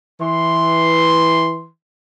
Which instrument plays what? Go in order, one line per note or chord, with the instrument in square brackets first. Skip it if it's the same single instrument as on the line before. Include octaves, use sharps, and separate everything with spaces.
[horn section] E3 C6